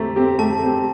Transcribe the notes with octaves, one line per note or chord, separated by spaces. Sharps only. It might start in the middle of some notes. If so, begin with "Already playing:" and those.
Already playing: A3 C4 G4 A#5
C4 G4
A3 A5
C4 G4